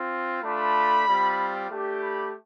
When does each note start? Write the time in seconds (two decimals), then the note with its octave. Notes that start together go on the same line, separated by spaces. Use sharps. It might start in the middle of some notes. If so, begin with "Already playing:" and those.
Already playing: C4 F4
0.42 A3 D4 F4 B5
1.06 G3 C4 F4
1.70 A3 D4 G4
2.01 B5